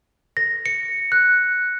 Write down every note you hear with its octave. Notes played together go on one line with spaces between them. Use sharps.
A#6
C#7
F#6